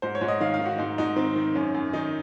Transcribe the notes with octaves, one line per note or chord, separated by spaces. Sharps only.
G#2 C5
C#5
G#2
D#5
D#3 F5
F5
D#3
F#4
G#2 D#4
G#2 D#4
D#3 C4
D#3
F#2 C#4
F#2
D#3 D#4